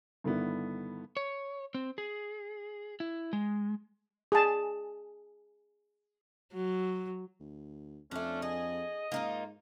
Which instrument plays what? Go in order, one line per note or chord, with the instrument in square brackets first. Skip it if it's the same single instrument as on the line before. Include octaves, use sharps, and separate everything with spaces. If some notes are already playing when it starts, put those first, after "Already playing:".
[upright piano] G2 D3 D#3 B3 E4
[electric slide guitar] C#5
C4
G#4
E4
G#3
[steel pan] G#4 A5
[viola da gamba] F#3
[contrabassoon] D2
[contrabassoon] F2 [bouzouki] A3 D4 [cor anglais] C#4
[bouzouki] G#4 [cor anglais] D#5
[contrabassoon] G#2 [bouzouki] A#3 D#4 F4